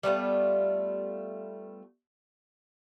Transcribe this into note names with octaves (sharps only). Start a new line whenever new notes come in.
G3 A3 B3 F4